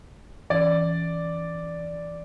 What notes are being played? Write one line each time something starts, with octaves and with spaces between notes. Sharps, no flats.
E3 C#4 D5